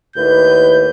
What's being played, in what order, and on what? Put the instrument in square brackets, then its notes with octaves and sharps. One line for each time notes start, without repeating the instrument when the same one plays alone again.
[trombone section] D#2 A2 B4 [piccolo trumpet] G6